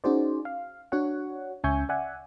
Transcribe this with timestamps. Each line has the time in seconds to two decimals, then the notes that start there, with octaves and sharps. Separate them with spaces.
0.04 C#4 D#4 F#4 G#4 C5 D5
0.45 F5
0.92 D4 F#4 C#5 F#5
1.64 C#2 C#4 E5 G#5 C#6 G6
1.89 D5 E5 F#5 G#5